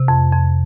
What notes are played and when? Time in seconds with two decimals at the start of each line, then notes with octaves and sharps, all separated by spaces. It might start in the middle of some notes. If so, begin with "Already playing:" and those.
Already playing: C3
0.08 F2
0.33 F2